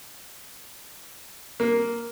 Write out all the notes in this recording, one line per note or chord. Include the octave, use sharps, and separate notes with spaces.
A#3